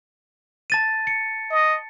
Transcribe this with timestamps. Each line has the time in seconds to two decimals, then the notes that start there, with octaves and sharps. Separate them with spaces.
0.70 A5 A6 D#7
1.07 C#7
1.50 D#5